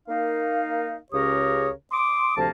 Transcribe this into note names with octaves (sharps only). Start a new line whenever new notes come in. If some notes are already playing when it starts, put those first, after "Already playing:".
A#3 D#4 F5
C#2 C#3 G4 A#4 C#5 D#6
C6 D6 D#6
D2 C3 F3 A#3 A5